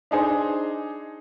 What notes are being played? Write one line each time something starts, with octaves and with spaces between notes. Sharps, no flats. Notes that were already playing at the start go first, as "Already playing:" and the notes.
D4 D#4 G#4 C5